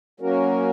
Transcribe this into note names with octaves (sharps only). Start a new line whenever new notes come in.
F#3 A#3 C#4 F#4 A#4